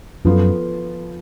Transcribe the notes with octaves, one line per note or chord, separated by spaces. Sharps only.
F#2 F3 B3 F4 A4